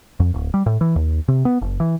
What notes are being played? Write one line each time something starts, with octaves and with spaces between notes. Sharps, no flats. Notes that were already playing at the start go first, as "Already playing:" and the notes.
F2
D1
G3
A2
E3
D#2
C3
B3
F#1
E3